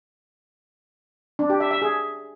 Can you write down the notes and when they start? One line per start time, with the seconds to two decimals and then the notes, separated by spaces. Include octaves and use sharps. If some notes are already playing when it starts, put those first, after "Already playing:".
1.39 D4
1.50 G4
1.60 E5
1.71 E5
1.82 G#4